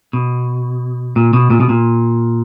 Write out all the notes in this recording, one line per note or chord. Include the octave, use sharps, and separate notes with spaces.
B2
A#2
B2
A#2
B2
A#2